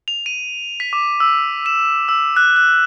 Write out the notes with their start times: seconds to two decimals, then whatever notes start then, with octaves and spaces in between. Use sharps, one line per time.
0.08 F7
0.26 D#7
0.80 B6
0.93 D6
1.20 E6
1.66 E7
2.09 E6
2.37 F#6
2.56 F#6